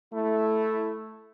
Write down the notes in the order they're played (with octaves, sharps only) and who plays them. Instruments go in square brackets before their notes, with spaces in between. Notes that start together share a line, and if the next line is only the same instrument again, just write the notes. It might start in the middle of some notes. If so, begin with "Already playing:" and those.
[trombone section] A3 E4